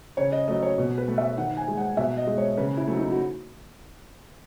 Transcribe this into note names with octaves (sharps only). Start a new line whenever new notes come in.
C#3 C#5
D#5
F#3 A3 D#5
C#5
B2
B4
A3
E5
D#3 F#5
G#5
G#3
F#5
B2 E5
D#5
G#3
C#5
C#3 B4
E4
F#3 A3
D#4
F#4